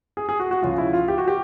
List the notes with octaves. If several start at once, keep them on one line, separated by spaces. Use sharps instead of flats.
G#4
G#4
F#4
F#4
C#2 C#3 F3 F4
E4
F4
G4
F#4
G4